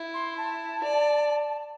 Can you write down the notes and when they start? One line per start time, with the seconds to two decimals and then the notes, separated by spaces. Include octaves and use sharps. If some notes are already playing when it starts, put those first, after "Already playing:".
Already playing: E4
0.14 C6
0.38 A5
0.83 D5